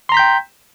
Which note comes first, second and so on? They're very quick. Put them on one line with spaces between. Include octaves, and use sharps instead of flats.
C6 A#5 B6 G6 G5